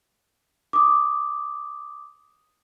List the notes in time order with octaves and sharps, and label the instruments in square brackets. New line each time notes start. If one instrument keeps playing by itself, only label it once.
[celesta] D6 D#6